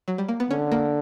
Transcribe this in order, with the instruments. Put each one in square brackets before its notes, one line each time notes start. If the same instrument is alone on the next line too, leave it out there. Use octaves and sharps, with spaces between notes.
[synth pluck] F#3
G3
A#3
B3
[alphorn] D3 [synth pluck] C#4
[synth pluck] A#3